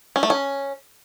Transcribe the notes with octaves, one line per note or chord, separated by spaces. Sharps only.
C#4
A3
C#4